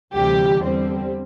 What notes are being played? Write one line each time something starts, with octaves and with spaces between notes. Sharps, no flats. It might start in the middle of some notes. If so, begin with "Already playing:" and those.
D2 C3 E3 G3 G4
E2 D3 G3 C4